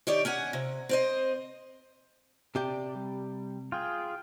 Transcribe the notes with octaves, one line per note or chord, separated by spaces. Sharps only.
D#3 G4 C#5 D5
C#4 F#5 G#5
C3
C4 C5 D#5
C3 G4 D5 G5
G3
F4 G#4 G5